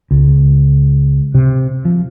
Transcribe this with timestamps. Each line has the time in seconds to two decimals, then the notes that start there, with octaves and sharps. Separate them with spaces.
0.11 C#2
1.34 C3
1.85 F3